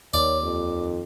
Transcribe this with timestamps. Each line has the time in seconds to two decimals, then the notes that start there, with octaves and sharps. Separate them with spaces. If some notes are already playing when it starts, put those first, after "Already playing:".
0.14 D#2 C#5 D5
0.42 F2